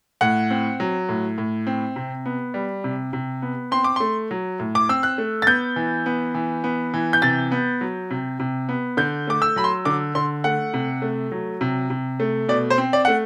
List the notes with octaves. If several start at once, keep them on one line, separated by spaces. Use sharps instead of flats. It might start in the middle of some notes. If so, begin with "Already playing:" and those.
A2 F#5
C4
F#3
A2
A2
C4
C3
B3
G3
C3
C3
B3
C4 C6
D6
A3 C6
F#3
A2
D6
C4 E6
F#6
A3
A6
B3 G6
E3
B3
E3
B3
E3
G6
C3 A6
B3
F#3
C3
C3
B3
D3 G6
A3 D6
E6
F#3 B5
C6
D3 D6
D3 C6
A3 F#5
C3
A3
F#3
C3
C3
A3
B2 D5
C5
C4
D5
A3 F#5